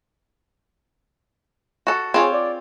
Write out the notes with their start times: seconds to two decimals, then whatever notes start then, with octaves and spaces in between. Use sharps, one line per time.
1.87 F#4 A4
2.14 C4 F4 G#4 C#5
2.33 D5